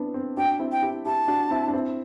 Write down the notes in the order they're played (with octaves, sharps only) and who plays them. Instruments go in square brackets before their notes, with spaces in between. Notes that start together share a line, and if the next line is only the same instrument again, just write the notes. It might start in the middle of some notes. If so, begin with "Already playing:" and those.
Already playing: [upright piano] B3 C4 D4 E4
C4
[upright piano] D4 F#4 [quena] G5
[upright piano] C4 E4
[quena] G5
[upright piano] E4 G4
[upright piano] E4 G4 [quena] A5
[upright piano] D4 F#4
C4 E4
D4
C4 E4